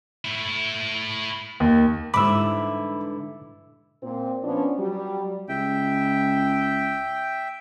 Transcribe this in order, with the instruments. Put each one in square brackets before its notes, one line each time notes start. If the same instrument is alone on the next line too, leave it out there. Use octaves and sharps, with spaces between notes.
[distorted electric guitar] A3 E4
[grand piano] D#2
[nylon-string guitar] G#2 D3 G3 [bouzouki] E3 E4 [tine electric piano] B5 [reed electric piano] D6 E6
[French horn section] A#2 C4
F3 B3 C#4 D4
F#3 G3
[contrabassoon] C#2 [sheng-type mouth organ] E5 G5